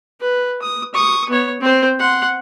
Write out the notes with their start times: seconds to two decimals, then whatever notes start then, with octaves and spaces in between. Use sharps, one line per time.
0.21 B4
0.62 D#6
0.94 C#6 D#6
1.29 B3 C#5
1.61 C4 C5
1.99 F#5 C6